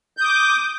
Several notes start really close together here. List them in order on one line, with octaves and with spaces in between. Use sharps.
G6 D#6 D6